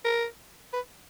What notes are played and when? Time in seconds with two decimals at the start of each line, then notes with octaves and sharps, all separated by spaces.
0.05 A#4
0.73 B4